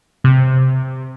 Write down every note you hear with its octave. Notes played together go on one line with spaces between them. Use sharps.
C3